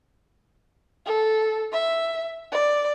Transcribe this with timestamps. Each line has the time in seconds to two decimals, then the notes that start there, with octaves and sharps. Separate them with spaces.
1.06 A4
1.72 E5
2.52 D5